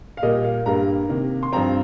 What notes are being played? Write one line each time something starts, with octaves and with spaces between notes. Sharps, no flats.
F5
A#2 G3 A#3 D#5
F5
G2 G3 A#3 A#5
C3 D#3 A#3
C6
G2 F3 C4 A#5